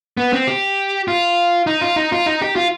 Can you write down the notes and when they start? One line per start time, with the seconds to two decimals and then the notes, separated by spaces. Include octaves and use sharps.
0.17 B3
0.33 C4
0.47 G4
1.08 F4
1.67 D#4
1.81 F4
1.96 D#4
2.12 F4
2.26 D#4
2.42 G4
2.56 F4